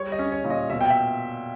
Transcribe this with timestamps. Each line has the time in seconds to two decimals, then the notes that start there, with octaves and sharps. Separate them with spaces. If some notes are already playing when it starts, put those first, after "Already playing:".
Already playing: G3 C#5
0.12 D#5
0.19 C#4
0.32 C#5
0.44 A#2
0.50 D#5
0.70 B2 E5
0.81 G5
0.90 E5